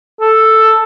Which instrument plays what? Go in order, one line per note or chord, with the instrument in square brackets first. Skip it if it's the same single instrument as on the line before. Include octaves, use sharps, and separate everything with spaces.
[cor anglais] A4